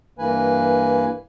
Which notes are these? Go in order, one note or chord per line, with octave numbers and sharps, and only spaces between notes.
G2 E3 A#3 B4 G#5